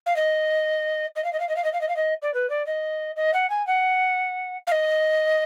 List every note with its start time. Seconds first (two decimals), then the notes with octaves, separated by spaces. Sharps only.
0.06 F5
0.16 D#5
1.16 D#5
1.24 F5
1.33 D#5
1.40 F5
1.49 D#5
1.56 F5
1.64 D#5
1.73 F5
1.81 D#5
1.89 F5
1.96 D#5
2.22 D5
2.34 B4
2.50 D5
2.66 D#5
3.16 D#5
3.34 F#5
3.50 G#5
3.67 F#5
4.67 F5
4.72 D#5